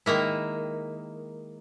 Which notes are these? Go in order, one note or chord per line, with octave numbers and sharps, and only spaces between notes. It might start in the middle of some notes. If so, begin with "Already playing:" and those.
D#3 G#3 A#3 E4